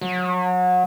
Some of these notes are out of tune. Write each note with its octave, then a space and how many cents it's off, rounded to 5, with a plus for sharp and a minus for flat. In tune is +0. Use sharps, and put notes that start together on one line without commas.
F#3 -30